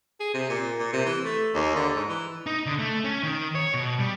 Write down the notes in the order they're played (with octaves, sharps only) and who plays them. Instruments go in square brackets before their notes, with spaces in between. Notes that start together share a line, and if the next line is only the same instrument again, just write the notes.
[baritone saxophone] G#4
C3
A#2
A#2
C3
E3
A3
D#2
D3
G#2
E3
[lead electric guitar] D#4
D3
A3
C#4
D#3
C#5
B2
G3